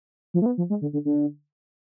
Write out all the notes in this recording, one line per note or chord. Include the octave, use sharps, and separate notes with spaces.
F3
A3
B3
F3
G#3
D3
D3
D3